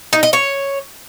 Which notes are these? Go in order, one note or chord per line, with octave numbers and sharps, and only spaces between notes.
D#4
D#5
C#5